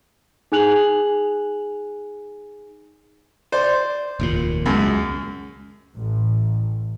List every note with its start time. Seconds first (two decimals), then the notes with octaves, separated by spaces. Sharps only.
0.52 D#4 G#4 G#5 F#6 F7 F#7
3.52 C5 D5
4.20 F1 D#2 A#2
4.66 C#2 F#2 F#3 G#3
5.96 A1